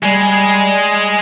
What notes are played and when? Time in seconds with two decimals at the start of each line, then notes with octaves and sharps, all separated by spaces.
0.03 G3 G#3